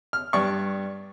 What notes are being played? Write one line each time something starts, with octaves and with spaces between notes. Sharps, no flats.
F6
G2 D5 C#6